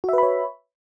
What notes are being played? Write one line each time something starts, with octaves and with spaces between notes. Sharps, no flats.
F#4 B4 C#5 E5 B5